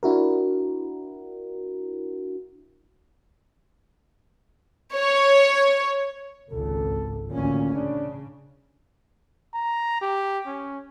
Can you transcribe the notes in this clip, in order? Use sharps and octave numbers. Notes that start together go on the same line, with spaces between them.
D4 E4 F#4 A#4
C#5
G#1 C#2 A4
A1 D2 A#2 C#4
C#3 D4
A#5
G4
C#4